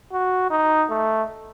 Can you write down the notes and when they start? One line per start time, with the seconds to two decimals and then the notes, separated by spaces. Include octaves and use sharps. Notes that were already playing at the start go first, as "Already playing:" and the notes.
0.12 F#4
0.50 D#4
0.89 A3